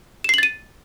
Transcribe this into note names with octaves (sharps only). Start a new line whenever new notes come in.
A6 C7 D#7 E7 F#7